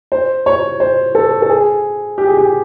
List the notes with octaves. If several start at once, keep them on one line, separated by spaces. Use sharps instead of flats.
C5
C#5
C5
A4
A4
G#4
G4
G#4
G4